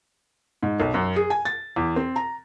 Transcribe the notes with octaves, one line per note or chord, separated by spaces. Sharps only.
G#2
B1
F#2
G#4
G#5
A6
E2
C4
A#5